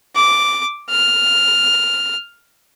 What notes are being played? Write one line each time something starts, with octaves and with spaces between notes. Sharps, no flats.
D6
F6